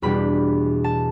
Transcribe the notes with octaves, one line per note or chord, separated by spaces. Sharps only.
E2 B2 G3 D4 B5
A5